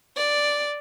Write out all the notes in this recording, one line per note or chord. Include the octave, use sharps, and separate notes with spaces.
D5